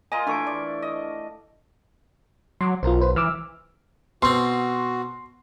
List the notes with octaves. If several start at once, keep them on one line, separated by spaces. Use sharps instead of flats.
F4 A#4 D#5 G#5
E3 A3 D4 C#6 D7
D5
D#5
F#3 C6 D6
B1 F4 A#4 C5
B4 C5
E3 D6 E6 F6
B2 C4 F#4 C6